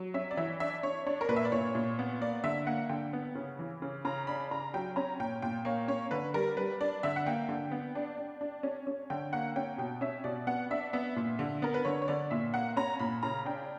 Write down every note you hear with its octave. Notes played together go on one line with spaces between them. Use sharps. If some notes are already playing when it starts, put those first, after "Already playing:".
Already playing: F#3
C#4 E5
D5
E3 E5
D4 E5
D4 C#5
D4 C#5
A#4
A#2 B4
E5
D5
A#2 C#5
A#2
B3
A#3 D5
D3 E5
A#3 F#5
D3 G5
B3
C#3
E3
C#3
C#3 A#5
D4 B5
C#3 A#5
F#3 G5
C#4 A#5
A#2 G5
A#2 G5
A#3 C#5
C#4 C#5
D3 B4
G3 A#4
G3 B4
D4 D5
D3 E5
F#5
A#3 G5
D3
B3
D4
D4
D4
C#4
C#4
D3 G5
A#3 F#5
C#4 G5
B2 G5
C#4 E5
B2 D5
B3 F#5
D4 E5
B3 E5
A#2
D3
B3 A#4
B4
D3 C#5
C#5
D3 D5
A#2 E5
A#3 F#5
C#4 A#5
A#2 B5
C#3 A#5
D4 G5